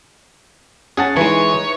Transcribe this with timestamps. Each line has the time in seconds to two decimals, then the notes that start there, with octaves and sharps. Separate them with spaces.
0.97 C#4 G#4 F#5 A5
1.17 E3 G#3 D#4 E4 B4 C#5